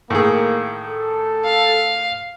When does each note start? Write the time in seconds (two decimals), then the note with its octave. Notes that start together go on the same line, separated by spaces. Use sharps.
0.10 A2 D#3 A#3 G#4
0.86 A4
1.44 F5